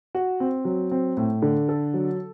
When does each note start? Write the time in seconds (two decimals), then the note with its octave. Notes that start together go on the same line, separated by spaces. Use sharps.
0.15 F#4
0.40 C4
0.65 F#3
0.91 C4
1.17 A2
1.42 D3
1.69 A4
1.94 F#3